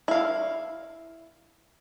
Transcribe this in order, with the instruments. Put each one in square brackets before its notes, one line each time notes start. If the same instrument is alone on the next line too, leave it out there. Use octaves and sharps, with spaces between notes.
[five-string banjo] E4 F5